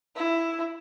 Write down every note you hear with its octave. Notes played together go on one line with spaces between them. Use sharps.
E4